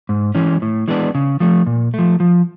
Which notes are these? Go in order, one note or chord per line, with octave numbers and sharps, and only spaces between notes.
G#2
E3 G#3 C#4
A2
E3 G#3 B3 D4
C#3
F3 A3
A#2
F3 A3
F3